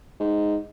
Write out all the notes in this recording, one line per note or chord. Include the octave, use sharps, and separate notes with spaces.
G#2